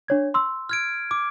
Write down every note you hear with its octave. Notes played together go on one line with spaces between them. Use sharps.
D4 C#5 G#6
C6 E6
F6 G#6 D7
D6